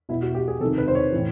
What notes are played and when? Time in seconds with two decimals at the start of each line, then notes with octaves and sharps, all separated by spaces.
0.09 B2 E4
0.22 F#4
0.35 G4
0.48 G#4
0.60 C3 A4
0.65 D#3
0.78 B4
0.88 C5
0.95 C#5
1.12 A2 E3